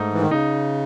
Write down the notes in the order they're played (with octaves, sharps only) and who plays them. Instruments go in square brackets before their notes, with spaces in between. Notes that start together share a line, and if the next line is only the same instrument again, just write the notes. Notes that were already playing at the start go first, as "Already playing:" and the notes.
Already playing: [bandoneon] G#2 [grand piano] A3 D#4
[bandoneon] E3
D#3
[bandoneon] C#3 [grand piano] D#4